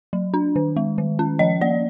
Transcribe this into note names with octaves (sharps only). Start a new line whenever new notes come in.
F#3
D4
D#3
G#3
D#3
C#4
F3 D#5
A#3 D5